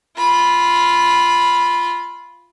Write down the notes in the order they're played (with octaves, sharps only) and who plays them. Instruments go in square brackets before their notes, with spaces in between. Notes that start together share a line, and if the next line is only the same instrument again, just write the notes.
[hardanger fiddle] F4 B5